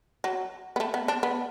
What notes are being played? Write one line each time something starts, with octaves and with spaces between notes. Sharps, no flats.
F#3
B3
A3
B3
D4
B3